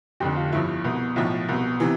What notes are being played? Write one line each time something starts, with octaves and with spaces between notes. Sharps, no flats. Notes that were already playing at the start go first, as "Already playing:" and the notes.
F1 F2 D3 G4
G4
F4
G1 G2 F3 E4
C2 B2
B1 A2 F3 E4
C2 B2
C3 E3